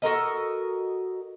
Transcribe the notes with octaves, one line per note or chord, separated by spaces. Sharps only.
F#4 A4 A#4 D#5